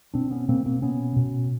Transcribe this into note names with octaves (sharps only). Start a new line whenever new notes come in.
B2 C4 D4
B3 C#4
B2 A#3 C4
A#3 C4
B2 B3 C#4
B2